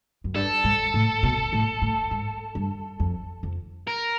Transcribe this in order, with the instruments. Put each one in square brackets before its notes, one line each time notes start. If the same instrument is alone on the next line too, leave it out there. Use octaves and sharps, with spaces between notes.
[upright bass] F#2
[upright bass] G2 [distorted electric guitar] A4
[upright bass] G#2
A2
B2
A2
A2
G#2
G2
F2
F2
[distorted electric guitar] A#4